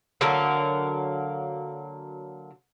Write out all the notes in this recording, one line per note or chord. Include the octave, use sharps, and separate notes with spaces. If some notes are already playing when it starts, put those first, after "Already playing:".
D3 F#3 A#3 A#4